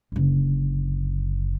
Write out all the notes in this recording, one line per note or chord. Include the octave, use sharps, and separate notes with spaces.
F#1 D3